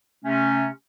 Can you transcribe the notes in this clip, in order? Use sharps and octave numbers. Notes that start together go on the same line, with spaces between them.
C3 A3 C#4